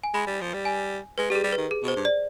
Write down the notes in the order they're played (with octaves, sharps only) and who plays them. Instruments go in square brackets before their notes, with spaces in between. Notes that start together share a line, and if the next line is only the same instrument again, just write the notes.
[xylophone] G#5
[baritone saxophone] G#3 [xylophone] B5
[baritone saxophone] G3
F3
G3
[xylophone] G#5
[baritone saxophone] G#3 [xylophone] B4
[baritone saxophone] G3 [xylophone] G4
[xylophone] G#4
[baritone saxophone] G3
[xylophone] B4
[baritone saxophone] D#3
[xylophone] G#4
[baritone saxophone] B2
[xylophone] C5
[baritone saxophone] G2
[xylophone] D5